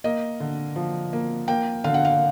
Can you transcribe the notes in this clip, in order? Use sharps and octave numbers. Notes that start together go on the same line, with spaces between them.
A#3 D#5
D3
F3
A#3
A#3 G5
D3 F5
F#5
F5